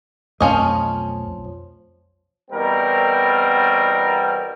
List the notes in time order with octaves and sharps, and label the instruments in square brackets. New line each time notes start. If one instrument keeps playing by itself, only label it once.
[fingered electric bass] B1 F2 A3 [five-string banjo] F3 C#4 D#5
[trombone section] E2 B2 G3 C4 A#4